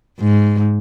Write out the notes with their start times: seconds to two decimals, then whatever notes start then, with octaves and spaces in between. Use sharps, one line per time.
0.19 G#2